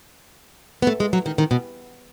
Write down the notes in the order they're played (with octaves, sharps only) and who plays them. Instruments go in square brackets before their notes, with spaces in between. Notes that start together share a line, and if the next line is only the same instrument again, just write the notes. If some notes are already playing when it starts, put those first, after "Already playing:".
[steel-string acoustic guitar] B3
A3
G#3
F#3
D#3
D#3
B2